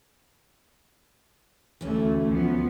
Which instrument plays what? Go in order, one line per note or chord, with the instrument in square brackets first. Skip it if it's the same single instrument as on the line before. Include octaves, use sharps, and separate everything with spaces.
[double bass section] D2 A3 [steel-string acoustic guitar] E3 C#4
[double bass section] D2 [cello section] F3 B3